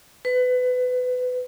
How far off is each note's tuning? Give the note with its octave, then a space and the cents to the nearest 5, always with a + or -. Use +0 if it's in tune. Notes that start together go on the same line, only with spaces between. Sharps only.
B4 +25